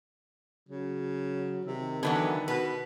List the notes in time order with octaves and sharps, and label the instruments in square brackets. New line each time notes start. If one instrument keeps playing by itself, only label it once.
[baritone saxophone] C#3 [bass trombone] F#3
[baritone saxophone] C3 [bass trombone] D#3
[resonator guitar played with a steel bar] D3 E3 F#3 [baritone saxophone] B3
[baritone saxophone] B2 [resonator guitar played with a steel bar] B4